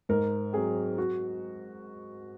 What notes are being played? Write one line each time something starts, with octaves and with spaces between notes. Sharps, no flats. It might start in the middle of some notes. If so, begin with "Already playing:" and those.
G#2 A#4
F#3 C4 G#4
F#4